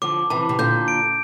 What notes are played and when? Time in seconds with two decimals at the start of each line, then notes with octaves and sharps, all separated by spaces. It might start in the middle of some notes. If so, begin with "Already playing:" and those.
0.02 D3 F3 D6
0.30 C3 E3 A5
0.49 C3
0.59 A#2 D3 G6
0.88 D7